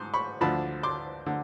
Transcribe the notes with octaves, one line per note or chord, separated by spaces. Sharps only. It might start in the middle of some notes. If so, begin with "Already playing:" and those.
Already playing: G#2 C6 D6
B5 C#6
D2 D3 F3 A5 B5
C6 D6
D3